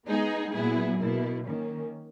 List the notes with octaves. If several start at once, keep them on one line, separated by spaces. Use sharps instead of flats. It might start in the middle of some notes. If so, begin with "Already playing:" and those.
G#3 B3 D#4 G#4
A#2 F#3 B3 E4 G#4
B2 A#3 E4
D#3 A#3 C#4